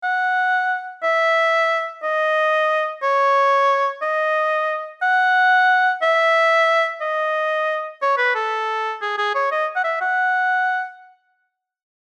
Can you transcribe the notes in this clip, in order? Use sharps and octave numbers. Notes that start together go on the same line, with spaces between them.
F#5
E5
D#5
C#5
D#5
F#5
E5
D#5
C#5
B4
A4
G#4
G#4
C#5
D#5
F#5
E5
F#5